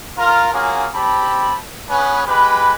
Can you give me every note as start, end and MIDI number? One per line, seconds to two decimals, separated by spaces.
0.18 0.51 65
0.18 0.51 70
0.53 0.86 58
0.53 0.86 61
0.53 0.86 65
0.53 0.86 66
0.53 0.86 68
0.94 1.56 60
0.94 1.56 67
0.94 1.56 81
0.94 1.56 83
1.89 2.22 59
1.89 2.22 61
1.89 2.22 68
1.89 2.22 71
2.27 2.75 56
2.27 2.75 67
2.27 2.75 71